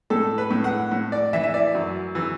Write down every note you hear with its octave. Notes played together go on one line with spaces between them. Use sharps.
A2 A4
B4
A2
F#5
A2
D5
E3 E5
E5
D5
F#2
E3